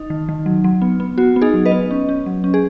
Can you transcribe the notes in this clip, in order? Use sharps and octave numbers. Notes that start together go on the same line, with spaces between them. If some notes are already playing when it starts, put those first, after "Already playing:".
Already playing: D#4
D#3
D#3
F#3
F#3
B3
B3
B3 F#4
B3
D#4 G#4
F#3
B4 D#5
B3
C#4
C#4
F#3
C#4
G#4